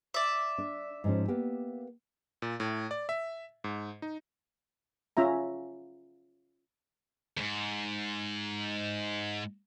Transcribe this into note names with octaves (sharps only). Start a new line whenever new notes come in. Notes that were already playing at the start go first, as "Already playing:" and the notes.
D5 E5
D4
G#2 F3 C#4
A#3 B3 G4
A#2
A2
D5
E5
G#2
D#4
C#4 F4 E5 A#5
E2 G#2